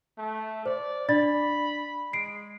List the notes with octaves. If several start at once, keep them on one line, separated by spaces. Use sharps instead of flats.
A3
C5 D5
D4 D5 B5 A6
G#3 C7 D7